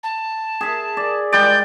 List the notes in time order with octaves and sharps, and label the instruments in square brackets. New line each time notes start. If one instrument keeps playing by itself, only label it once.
[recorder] A5
[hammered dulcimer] G#4 E5
D5
[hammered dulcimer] G3 G#3 D5 [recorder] G6